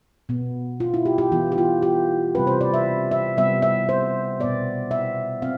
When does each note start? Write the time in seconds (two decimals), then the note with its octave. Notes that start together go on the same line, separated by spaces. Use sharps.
0.29 B2 B3
0.80 F4
0.94 E4
1.05 G4
1.18 G4
1.32 E3 B3 F4
1.52 G4
1.58 F4
1.82 G4
2.35 C3 G3 C4 B4
2.47 C5
2.61 D5
2.74 E5
3.11 E5
3.37 C3 G3 B3 E5
3.62 E5
3.89 C5
4.40 B2 B3 D5
4.91 E5
5.42 C4 F5